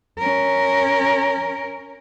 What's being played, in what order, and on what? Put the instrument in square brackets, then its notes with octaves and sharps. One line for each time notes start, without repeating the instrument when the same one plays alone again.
[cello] C#4 A#4